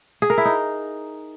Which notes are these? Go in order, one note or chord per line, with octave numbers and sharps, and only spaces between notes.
G#4
A#4
E4
D#4